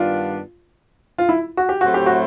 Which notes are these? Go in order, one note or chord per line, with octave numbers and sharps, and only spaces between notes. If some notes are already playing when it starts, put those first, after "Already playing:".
Already playing: G2 D#3 G3 B3 D4 F4
F4
E4
F#4
G4
A2 F#3 A3 C4 E4 F#4
G4
F#4